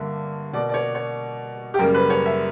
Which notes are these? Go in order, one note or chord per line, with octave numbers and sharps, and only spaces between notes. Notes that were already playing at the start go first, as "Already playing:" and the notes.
Already playing: G2 D3 A#3 E5
B2 A#3 D5
D5
C#5
C#5
G4
F#2 C#3 G3 A#3 A#4
B4
C#5
E5